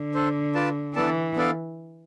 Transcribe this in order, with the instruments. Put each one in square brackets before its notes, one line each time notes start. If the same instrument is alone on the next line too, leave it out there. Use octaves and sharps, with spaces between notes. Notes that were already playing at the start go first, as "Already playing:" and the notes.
Already playing: [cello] D3
[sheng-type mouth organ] D4 A4 C5
F4 B4 D5 A5
[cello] E3 [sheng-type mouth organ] B3 D4 A4 D5 A5
[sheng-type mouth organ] B3 D4 A4 D5 F5